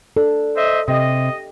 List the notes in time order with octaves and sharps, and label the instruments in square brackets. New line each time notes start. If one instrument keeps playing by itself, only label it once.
[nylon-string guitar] D4 [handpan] A4
[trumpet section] C5 D#5 E5
[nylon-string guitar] C3 [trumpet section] D#5